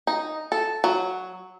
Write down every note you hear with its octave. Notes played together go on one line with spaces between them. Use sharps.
D#4
A4
F#3